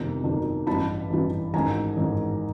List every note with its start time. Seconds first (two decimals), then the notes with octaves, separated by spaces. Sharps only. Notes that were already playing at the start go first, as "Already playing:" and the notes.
Already playing: G1 F2 C3 D#3
0.24 G1 F2 C3 D#3
0.67 A1 G2 E3 A5 B5
1.10 A1 G2 E3
1.54 A1 G#2 D#3 G#5 A#5
1.97 A1 G#2 D#3